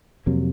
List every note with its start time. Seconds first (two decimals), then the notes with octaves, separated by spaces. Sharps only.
0.26 F2 C3 F#3 A#3